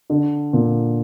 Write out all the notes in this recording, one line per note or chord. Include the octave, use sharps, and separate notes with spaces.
D3
A#2